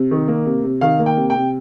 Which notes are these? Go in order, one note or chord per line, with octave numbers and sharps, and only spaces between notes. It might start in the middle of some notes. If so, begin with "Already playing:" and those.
Already playing: C3
D#3
A#3
C3
C3
D#3 F5
A#3
G5
C3
G5
C3